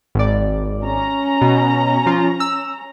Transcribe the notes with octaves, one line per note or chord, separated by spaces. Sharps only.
G#1 D5
C#4 A#5
B2
F3 F4
E6